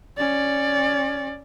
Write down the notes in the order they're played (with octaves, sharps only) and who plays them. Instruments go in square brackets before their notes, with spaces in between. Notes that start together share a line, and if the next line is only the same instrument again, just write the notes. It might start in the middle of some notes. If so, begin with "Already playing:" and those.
[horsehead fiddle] C#4 D5